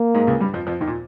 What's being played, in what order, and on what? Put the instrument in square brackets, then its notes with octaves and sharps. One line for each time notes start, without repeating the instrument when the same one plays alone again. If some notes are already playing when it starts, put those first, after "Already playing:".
Already playing: [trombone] A#3
[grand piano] G#2 G#3
C#2 C#3
G2 G3
F2 F3
F2 F3
D#2 D#3
A#2